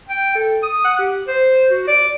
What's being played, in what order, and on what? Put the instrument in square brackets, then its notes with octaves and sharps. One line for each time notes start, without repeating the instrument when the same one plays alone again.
[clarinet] G5
A4
D#6
F#5
G4
C5
F#4
D5